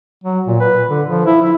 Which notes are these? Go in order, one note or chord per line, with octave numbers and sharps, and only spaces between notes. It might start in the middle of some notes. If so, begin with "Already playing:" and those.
F#3
A#2
B4
D3
F3
E4
E4